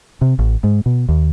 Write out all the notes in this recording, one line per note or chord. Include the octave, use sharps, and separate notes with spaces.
C3
A1
G#2
B2
D#2